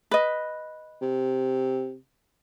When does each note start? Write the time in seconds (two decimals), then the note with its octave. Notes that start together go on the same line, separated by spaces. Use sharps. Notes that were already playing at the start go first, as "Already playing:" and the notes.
0.11 B4 D#5
1.02 C3